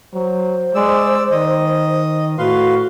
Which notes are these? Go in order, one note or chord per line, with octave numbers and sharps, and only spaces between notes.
F#3 C5
G#3 D5 E6
D#3 D#5
A2 F#4 B4 F5 C6